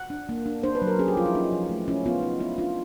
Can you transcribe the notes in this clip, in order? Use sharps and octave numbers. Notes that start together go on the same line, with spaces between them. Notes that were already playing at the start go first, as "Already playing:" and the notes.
Already playing: F#5
D4
A#3
D4
D4 C5
B4
F#3
A#4
C#4 G#4
G4
F3 F4
E4
C#4 D#4
F3
A3
C#4 E4
B3 F4
D#4
B3 E4
D4 F4